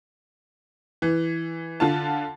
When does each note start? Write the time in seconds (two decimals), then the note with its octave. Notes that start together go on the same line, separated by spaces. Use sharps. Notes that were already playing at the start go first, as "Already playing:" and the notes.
1.02 E3
1.80 D3 F4 A5